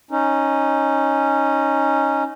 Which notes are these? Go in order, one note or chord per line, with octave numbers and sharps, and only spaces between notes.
C#4 D#4